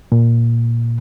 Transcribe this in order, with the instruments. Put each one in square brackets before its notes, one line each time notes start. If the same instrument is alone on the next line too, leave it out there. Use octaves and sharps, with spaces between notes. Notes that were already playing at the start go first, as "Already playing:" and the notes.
[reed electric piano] A#2